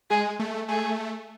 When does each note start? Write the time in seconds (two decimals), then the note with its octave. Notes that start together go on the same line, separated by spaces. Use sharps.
0.10 G#3 G#4
0.39 A3
0.68 A3 G#4